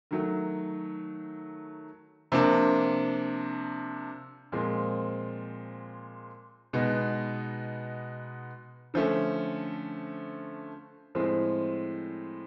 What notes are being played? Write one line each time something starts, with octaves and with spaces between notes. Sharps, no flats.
D#3 F#3 A3
C3 F3 A#3 D4
A#2 F3 G#3 C4
B2 G#3 B3 D#4
D3 F3 A3 C#4
A2 F3 G#3 C4